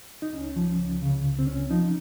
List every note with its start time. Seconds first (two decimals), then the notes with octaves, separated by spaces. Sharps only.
0.22 D#4
0.33 C#2 C#4
0.56 F3
0.79 C#2
1.02 C#3
1.24 C#2
1.39 C4
1.47 C#2 C#4
1.70 F3 D#4